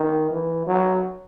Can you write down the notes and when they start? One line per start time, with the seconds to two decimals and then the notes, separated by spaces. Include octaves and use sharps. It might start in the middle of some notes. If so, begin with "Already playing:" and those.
Already playing: D#3
0.31 E3
0.66 F#3